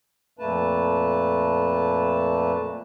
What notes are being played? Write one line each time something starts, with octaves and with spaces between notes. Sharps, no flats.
F2 A#2 A3 A#3 B4 A5